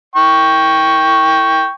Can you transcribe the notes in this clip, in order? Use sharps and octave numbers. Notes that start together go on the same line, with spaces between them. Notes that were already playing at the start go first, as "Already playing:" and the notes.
G5 C#6